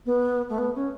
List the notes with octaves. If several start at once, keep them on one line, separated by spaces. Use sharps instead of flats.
B3
A3
B3
C#4